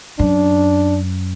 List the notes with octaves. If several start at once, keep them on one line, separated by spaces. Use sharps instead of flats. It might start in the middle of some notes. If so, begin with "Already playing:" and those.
F#2 D4